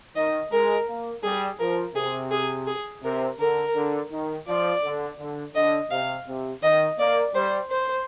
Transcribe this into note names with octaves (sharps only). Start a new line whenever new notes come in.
D#3 D#5
G#3 A#4
A#3
G3 G#4
F3 A#4
C3 G#4
G#4
G#4
C3 A#4
D3 A#4
D3
D#3
F3 D5
D3
D3
D3 D#5
C3 F5
C3
D#3 D#5
A#3 D5
G3 C5
C5